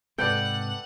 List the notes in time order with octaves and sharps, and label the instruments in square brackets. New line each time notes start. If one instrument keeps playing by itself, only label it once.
[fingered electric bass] G#2 C3 [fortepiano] A4 B4 D5 [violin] F#5 [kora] G5